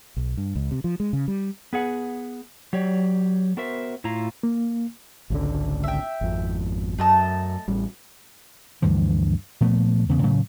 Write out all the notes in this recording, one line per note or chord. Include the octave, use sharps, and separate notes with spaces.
B1
G2
C#2
C3
F3
G#3
C#3
G3
B3 G#4 F#5
F#3 G4 C#5 D5
B3 F#4 A#4 C5 E5
A2 E4 F4 A#5
A#3
G#1 C#2 D3
E5 G5
G#1 F2
F#2 A3 D#5 A5
A1 G3
D2 G2 E3 F3
A#2 F3 A3 B3
E2 C#3 B3
A2 C#3 F#3 A3